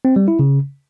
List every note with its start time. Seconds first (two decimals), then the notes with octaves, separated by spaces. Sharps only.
0.05 C4
0.16 G3
0.28 E4
0.39 C#3